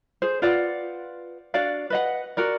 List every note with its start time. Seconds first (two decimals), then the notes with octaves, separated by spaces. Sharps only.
0.22 G#4 C5
0.42 F4 B4 D5 F#5
1.54 D4 F#4 D5 F5
1.90 B4 D#5 F#5
2.37 F#4 A#4 D5